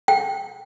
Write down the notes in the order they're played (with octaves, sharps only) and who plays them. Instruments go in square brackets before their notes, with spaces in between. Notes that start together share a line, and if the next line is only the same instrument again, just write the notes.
[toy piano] G5